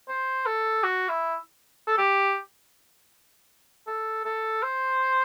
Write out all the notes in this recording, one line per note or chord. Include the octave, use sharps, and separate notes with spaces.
C5
A4
F#4
E4
A4
G4
A4
A4
C5